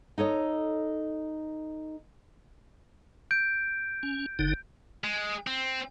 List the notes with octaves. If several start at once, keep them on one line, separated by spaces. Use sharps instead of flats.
D#4 A4 C#5 D#5
G6 D7
C#4
F#1 D3 D#4
G#3
C4